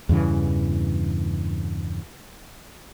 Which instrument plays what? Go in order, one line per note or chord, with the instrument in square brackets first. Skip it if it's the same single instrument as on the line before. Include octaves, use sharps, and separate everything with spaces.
[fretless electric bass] E2 G2 C#3 E3